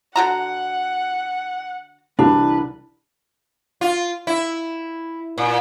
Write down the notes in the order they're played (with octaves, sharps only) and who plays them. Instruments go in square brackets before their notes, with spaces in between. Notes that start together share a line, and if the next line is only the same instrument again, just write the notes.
[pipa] D3 F#4 A#5 [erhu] F#5
[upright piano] C2 E3 G3 [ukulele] D4 [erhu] B4
[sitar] F4
E4
A#2